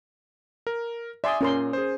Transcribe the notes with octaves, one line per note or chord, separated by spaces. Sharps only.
A#4
D5 E5 G#5 C6 D#6
A#2 C#4 A#4 C6
G#4 C5